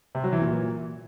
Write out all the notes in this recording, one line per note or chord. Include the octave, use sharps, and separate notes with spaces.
C3
F#3
E3
A#2